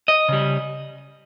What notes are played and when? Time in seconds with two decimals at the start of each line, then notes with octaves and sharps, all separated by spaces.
0.08 D#5
0.29 C#3 G3